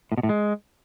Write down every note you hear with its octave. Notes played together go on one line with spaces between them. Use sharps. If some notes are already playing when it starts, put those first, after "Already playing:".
A2
B2
A2
G#3